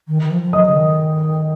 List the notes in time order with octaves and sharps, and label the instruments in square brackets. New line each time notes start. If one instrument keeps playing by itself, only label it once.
[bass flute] D#3
D#3
F3
F3
[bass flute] F#3 [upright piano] D#5 D#6
[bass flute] C#3
D#3